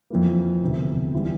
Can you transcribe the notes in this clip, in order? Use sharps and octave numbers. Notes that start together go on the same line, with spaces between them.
F2 E3 A#3
E1 D2 C3
E3 G3